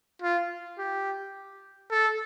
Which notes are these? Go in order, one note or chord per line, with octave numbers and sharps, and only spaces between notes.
F4
G4
A4